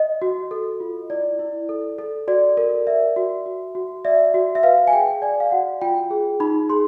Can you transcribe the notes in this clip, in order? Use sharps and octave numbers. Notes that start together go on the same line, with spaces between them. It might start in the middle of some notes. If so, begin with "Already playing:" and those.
Already playing: D#5
F#4
A4
F4
E4 D5
E4
A4
A4
F#4 D5
A#4
D5 E5
F#4
F#4
F#4
D5 E5
F#4
E5
B4 F5
G#5
G#4 G5
D5 G#5
F5
F#4 F#5
F4 G5
G#4
D#4 B5
G#4 C6